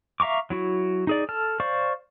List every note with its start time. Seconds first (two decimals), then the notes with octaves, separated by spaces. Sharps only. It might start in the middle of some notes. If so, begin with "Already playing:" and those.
0.20 E5 F5 A#5 C#6 D6
0.50 F#3 E4 F#4
1.07 D#4 G#4 D5
1.29 A4 A5 F6
1.60 C5 D5 F5 C#6